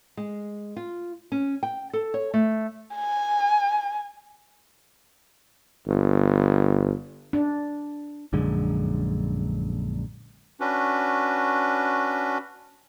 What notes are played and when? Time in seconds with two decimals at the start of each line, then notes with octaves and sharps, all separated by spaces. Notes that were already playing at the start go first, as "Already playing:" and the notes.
0.17 G#3
0.76 F4
1.32 C#4
1.63 G5
1.93 A4
2.14 C#5
2.34 A3
2.94 G#5
5.88 G1
7.33 D4
8.33 A#1 F#2 D3 G#3
10.60 C#4 D4 F#4 B4